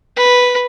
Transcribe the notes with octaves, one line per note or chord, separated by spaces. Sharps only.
B4